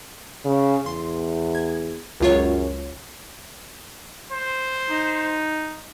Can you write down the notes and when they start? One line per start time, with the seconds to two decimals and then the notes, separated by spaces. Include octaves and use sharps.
0.45 C#3
0.86 E2 C6
1.55 G#6
2.21 C#2 F#2 F4 C#5
4.32 C5
4.89 D#4